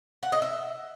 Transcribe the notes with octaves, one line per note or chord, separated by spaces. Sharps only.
F#5
D#5
E5